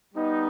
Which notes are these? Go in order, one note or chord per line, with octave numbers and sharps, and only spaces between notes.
G3 B3 D#4